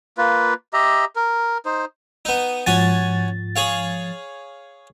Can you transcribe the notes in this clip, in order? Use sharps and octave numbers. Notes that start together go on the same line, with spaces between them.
A#3 F4 B4
G4 D#5 E5 A#5
A#4
D#4 C5
B3 D#4
G#2 F3 C#4 F#4 G#5 A6
G#4 C#5 F5